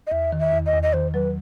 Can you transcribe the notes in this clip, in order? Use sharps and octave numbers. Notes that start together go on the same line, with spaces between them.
D#5
E2 E5
D#3
E5
E2
D#5
E2
D#5
D#3 C5
F#3 B4